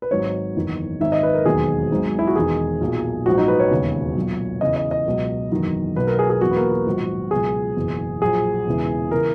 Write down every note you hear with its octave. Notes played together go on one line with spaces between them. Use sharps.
B4
G#1 G#2 F#3 C#5
F#1 E2 D#3
G#1 G#2 D#3 E5
D#5
B4
A#4
E1 D#2 D#3 F#3 G#4
G#1 G#2 F#3
E4
F#4
E1 E2 D#3 G#4
B1 A#2 F#3
A#1 G#2 F#3 F#4
D#4
B4
C#5
E1 D#2 C#3
B1 A#2 F#3
E2 C#3 E3 D#5
D#5
D#5
C#2 B2 F#3
F#1 E2 D#3 F#3
B1 B2 F#3 B4
A#4
G#4
G#4
E2 B2 F#3 F#4
B3
A#3
F#4
A#1 G#2 D#3 F#3
C#2 B2 F#3 G#4
F#1 E2 B2
A#1 A#2 F#3 G#4
E1 E2 C#3 E3
C#3 E3 A#4